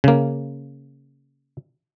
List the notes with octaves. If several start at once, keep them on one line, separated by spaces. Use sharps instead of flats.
C#3 A#3